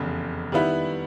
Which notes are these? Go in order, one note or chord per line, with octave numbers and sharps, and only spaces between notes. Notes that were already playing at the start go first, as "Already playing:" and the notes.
Already playing: F1 E2 C#3
D#3 G3 B3 E4